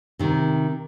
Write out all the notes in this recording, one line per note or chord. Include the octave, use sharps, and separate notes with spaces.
C3 D#3